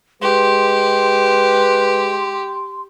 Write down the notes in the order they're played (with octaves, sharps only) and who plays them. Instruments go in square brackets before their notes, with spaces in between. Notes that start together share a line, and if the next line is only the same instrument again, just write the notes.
[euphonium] G#3 [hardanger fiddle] G4 [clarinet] B4 [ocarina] C6